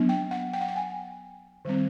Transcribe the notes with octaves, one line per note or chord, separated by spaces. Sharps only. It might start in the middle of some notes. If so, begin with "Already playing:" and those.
Already playing: F#3 B3 D4
G5
F#5
G5
F#5
G5
G#5
D#3 G3 C4